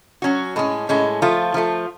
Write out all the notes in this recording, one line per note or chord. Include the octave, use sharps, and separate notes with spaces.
F#3 C#4 F#4
A2 G#3 C#4
A2 G#3 C#4
F3 A3 F4
F3 A3 F4